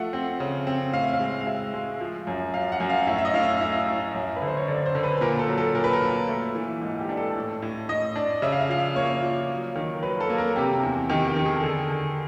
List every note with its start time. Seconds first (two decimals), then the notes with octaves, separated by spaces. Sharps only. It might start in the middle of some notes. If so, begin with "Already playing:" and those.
Already playing: F3 A3 F#5
0.13 C4
0.40 C#3
0.67 C4
0.93 A2 F5
1.03 E5
1.13 F5
1.20 G#3
1.41 F5
1.47 G#3 E5
1.74 G#3
2.00 F3
2.27 F#2
2.54 F#2 F5
2.72 F#5
2.80 F#2
2.89 F5
3.07 A2 E5
3.18 E5
3.25 D#5
3.34 A2 F5
3.43 E5
3.61 A2 E5
3.87 A2
4.15 F#2
4.36 B4
4.42 D3
4.47 C5
4.57 C#5
4.68 D3 D5
4.86 C5
4.95 D3
5.03 B4
5.17 B4
5.21 A#2 A#4
5.39 A4
5.48 F#3
5.58 A4
5.75 A#2 A#4
5.84 B4
5.93 A#4
6.02 A#2
6.28 A3
6.55 E3
6.81 G#2
7.00 G4
7.09 D4
7.17 A4
7.35 A2
7.62 A2
7.89 A2 D#5
8.16 D4
8.42 C#3 E5
8.52 F5
8.61 E5
8.69 F3 F5
8.78 E5
8.96 A#3 C#5
9.22 F3
9.50 F#3
9.76 D#3
10.03 F#3 B4
10.20 A4
10.30 A#3
10.38 A#4
10.56 C3 G4
10.83 E2
11.10 D#3 G4
11.28 G4
11.36 D#3
11.46 G#4
11.56 A4
11.63 D3 G#4
11.90 D3